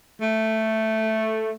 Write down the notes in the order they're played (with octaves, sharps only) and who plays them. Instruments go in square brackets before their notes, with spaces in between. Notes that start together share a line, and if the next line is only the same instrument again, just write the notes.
[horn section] A3